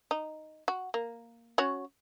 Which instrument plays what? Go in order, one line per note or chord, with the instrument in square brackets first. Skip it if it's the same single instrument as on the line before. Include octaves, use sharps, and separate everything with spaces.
[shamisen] D#4
F#4
A#3
C#4 F#4 C#5